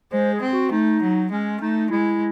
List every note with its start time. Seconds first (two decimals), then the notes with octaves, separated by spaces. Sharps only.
0.12 G#3 C5
0.32 G#4
0.42 C4
0.52 F#4
0.71 A3 D#4
1.02 F#3
1.31 G#3 C#4
1.61 A3 D#4
1.90 G#3 E4